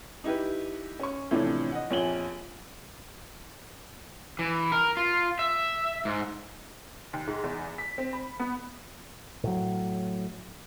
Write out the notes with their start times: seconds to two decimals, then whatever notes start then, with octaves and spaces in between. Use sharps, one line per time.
0.24 D#4 E4 G4 B4
1.00 C#4 C#6
1.31 A2 C3 E3 F3 C#4 D4
1.72 D#5 F#5
1.90 A#1 F2 C#5 G#5 F#7 G7
4.39 E3
4.72 A#4
4.97 F4
5.39 E5
6.05 G#2
7.13 D#2
7.27 G#2
7.44 E2
7.78 B6
7.98 C4
8.13 B5
8.40 B3
9.44 A2 F#3